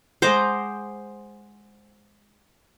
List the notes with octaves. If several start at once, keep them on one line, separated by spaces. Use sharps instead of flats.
G#3 C5 D#5 F#5 A#5 D6